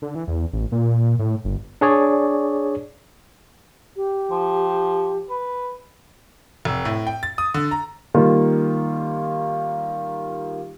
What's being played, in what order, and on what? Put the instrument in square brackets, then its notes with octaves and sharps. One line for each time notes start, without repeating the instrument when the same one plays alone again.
[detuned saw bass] D3
E3
E2
A1
A#2
A2
G1
[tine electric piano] D4 G#4 C#5 D5
[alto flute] G4
[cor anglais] F3
B4
[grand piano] F1
A2
G5
A6
D#6
D3
A#5
[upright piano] D#3 G3 A#3 F4